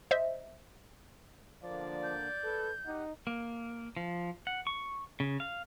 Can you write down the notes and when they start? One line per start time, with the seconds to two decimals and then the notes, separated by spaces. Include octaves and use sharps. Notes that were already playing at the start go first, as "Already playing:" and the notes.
0.11 C5 D#5 E5
1.63 D3 F3 A#3 D4 D5
2.03 G6
2.44 A4 B4
2.86 D#4 G4 F#5
3.27 A#3
3.97 F3
4.47 F#5
4.67 C#6
5.20 C#3
5.40 F5